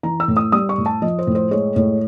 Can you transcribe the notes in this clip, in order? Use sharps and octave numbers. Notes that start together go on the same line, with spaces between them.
E3 A#5
E6
A2
D#6
G3 D#6
C#6
A2
A5
F3 D#5
C5
A2
C5
G#3 C#5
A2 C#5